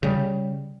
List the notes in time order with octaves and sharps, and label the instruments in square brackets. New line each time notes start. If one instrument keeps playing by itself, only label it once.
[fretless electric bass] C#3 G3